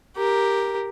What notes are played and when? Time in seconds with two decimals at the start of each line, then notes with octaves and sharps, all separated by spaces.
0.16 G4 A#4